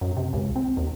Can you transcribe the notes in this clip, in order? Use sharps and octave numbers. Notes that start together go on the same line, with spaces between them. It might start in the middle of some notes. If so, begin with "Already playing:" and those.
F#2
C3
C#2
C4
D#2